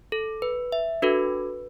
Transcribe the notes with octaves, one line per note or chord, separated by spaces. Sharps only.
A4
B4
E5
D4 F#4 A4 B4